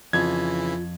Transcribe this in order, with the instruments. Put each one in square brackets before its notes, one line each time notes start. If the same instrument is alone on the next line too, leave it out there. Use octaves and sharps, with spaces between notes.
[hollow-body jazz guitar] F2 [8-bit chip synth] C#3 E3 E4 [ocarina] F4 [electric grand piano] G#6